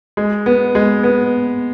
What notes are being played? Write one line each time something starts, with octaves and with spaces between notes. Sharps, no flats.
G#3
B3
G#3
B3